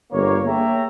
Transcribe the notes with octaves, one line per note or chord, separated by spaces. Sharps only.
G1 A#3 C#5
A#3 G#4 C#5 E5 G5 A#5